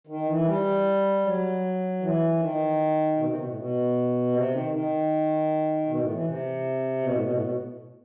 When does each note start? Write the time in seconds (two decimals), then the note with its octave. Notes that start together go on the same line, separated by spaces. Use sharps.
0.07 D#3
0.26 E3
0.46 G3
1.24 F#3
2.00 E3
2.40 D#3
3.16 B2
3.26 C3
3.35 B2
3.46 A2
3.54 B2
4.32 C3
4.52 D#3
4.70 D#3
5.86 B2
5.99 A2
6.12 E3
6.24 C3
7.02 B2
7.12 A2
7.21 B2
7.32 A2
7.40 B2